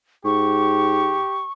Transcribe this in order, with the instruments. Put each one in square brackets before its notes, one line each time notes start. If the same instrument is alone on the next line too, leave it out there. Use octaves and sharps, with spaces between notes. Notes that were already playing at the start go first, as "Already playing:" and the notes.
[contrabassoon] G#2 [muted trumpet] G4 [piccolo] C#6